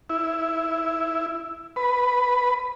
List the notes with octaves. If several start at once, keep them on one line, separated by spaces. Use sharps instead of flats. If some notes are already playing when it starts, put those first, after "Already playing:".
E4
B4